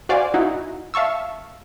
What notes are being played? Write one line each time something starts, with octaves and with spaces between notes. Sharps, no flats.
F#4 C5 D5 F5 G#5
D#4 E4 F#4
E5 F5 A5 C#6 E6